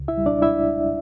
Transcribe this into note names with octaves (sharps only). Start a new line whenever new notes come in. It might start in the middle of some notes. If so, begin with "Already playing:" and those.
Already playing: C#2
E4 E5
G3
D4 D5
E4 E5